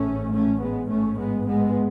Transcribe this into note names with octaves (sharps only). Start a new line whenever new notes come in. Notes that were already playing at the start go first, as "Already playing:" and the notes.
Already playing: A1 G#2 A3 C#4
A3 C#4
G#3 B3
A1 G#2 A3 C#4
G#3 B3
G#3 B3